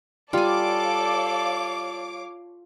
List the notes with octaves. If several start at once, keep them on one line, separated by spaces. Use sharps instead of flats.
G3 F4 A4 C#5 D5 F5 G#5 D6